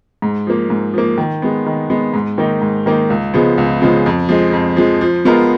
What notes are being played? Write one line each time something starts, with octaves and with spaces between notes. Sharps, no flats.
G#2
F3 A#3
G#2
F3 A#3
D#3
G#3 B3
D#3
G#3 B3
G#2
D#3 A#3 D#4
G#2
D#3 A#3 D#4
C#2
C#3 F3 G#3 B3
C#2
C#3 F3 G#3 B3
F2
F3 G#3
F2
F3 G#3
F3
G#3 B3 F4 A#4